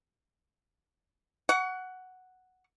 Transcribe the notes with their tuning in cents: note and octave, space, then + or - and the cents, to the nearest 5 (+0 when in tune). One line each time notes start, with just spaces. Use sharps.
F#5 +0 C#6 +30